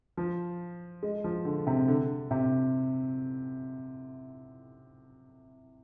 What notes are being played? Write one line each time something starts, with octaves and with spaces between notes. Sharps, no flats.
F3
G#3
F3
D3
C3
D3
C3